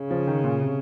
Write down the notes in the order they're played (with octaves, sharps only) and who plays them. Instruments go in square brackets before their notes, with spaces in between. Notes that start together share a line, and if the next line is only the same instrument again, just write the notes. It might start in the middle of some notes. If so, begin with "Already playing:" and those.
Already playing: [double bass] C#3
[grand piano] F3
D#3
A#2
C3